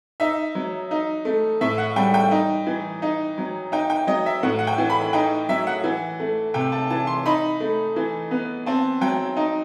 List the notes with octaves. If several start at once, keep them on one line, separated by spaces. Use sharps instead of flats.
D#4 E5
F#3
D#4
A3
A2 E5
F#5
G3 G5
G5
D#4
E3
D#4
F#3
D#4 G5
G5
F#3 D#5
E5
A2 F#5
F#5
G5
E3
B5
D#4 G5
F#3 E5
F#5
E3
A3
C3 G5
A5
E3 A5
C6
D#4 B5
A3
E3
B3
C4 A5
F#3 G5
D#4